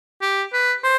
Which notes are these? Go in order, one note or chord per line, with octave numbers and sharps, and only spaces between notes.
G4
B4
C5